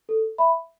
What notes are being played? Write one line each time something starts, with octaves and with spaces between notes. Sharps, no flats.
A4
E5 B5